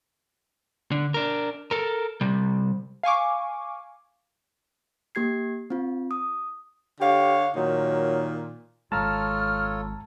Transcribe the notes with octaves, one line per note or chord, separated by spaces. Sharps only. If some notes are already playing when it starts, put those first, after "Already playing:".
D3
D4 A#4
A4 A#4
C3 G3
F5 G#5 C#6 D6
A#3 G4 G#6 C7
C4 F4
D#6
D3 G4 C#5 F5
A#2 D#3 F#3 D#4
G#1 G#3 F4 A4 C#5 A5 A#5 F6